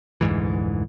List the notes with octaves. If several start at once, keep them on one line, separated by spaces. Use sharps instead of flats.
F1 D2 G#2 E3